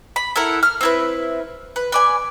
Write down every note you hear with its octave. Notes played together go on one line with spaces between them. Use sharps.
B5
E4 A4 A#4 F#5
F6
C4 E4 B4
B4
B4 D5 G#5